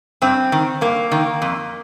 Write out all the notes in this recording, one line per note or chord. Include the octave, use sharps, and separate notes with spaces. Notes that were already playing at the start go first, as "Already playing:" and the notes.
G2 C4
D#3
G2 A#3
D#3
F2